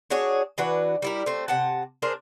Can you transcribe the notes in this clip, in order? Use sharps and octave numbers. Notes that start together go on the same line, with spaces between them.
D4 F#4 G#4 C#5
E3 D4 F#4 B4
G3 E4 A#4
A3 C4
C3 F#5 A5
D4 G#4 A#4 C5